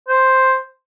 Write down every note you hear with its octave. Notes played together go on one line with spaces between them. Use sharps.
C5